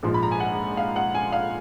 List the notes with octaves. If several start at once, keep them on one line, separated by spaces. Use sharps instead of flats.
A#1 G#2 F3 G#3
B5
A#5
G#5
F#5
F5
F#5
G#5
F5